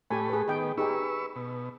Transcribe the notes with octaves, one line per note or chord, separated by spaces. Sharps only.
A2 A3 G4 G#5 B5
G#4 B4
D#3 B3 G#4 G5
D#4 G4 G#4 B4 C#6 E6
B2